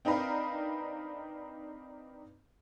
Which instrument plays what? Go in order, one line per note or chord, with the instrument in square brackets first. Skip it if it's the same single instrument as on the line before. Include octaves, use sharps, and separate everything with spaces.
[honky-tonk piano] C4 D4 D#4 A#4 B4 F5